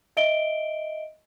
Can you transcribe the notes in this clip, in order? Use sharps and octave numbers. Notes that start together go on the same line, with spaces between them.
D#5 E5 D7 G7